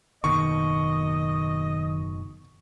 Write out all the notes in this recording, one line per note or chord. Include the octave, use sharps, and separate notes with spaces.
F#1 D#2 B2 D#3 D#5 C#6